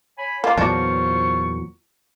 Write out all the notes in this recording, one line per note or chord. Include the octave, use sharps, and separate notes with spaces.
C#5 G#5 B5
A#3 F4
E2 A#2 F#3 D4 F4 C5 C#6